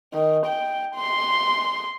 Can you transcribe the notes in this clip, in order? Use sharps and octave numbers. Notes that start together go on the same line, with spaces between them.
D#3
G5
C6